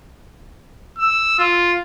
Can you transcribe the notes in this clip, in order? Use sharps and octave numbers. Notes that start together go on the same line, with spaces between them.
E6
F4